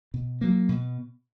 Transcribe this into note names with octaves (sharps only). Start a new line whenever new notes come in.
B2
F#3 A#3
B2